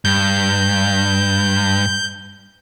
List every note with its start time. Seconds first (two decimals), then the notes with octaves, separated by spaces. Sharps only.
0.05 G2 G6